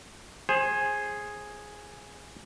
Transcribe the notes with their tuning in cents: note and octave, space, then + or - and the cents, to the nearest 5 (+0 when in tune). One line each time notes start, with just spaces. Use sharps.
G#4 +0 C5 +25